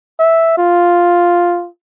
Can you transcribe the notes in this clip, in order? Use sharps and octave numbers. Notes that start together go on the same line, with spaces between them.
E5
F4